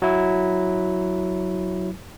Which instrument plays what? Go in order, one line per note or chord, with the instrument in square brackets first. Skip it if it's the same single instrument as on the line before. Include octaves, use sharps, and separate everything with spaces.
[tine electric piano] F#3 E4